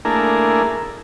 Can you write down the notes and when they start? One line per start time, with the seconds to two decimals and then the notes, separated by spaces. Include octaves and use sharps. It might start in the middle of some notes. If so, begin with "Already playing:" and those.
0.05 A3 A#3 D4 E4 G#4 A#4